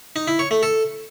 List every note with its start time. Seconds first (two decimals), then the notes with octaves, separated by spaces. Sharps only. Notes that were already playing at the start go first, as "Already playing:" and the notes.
0.16 D#4
0.28 E4
0.39 C#5
0.51 A3
0.63 A4